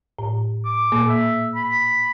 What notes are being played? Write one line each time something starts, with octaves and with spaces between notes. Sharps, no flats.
A2
D6
A#2 A#3
E5
B5